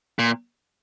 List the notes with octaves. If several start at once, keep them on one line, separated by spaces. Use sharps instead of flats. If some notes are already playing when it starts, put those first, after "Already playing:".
A#2